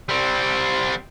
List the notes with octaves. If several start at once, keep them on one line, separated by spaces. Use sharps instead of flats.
G3 C4